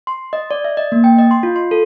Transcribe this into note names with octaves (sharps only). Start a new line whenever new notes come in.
C6
D#5
D5
E5
D#5
A#3
G5
D#5
C6
F4
C6
A4